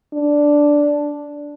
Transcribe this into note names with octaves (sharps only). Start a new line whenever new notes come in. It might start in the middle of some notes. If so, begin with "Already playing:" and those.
D4